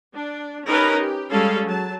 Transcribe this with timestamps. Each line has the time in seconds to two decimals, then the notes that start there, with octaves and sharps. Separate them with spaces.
0.16 D4
0.66 C#4 D#4 G4 A#4 B4
0.98 G4
1.31 G3 G#3 C#4 G#4 A4 F5
1.67 F#3 A5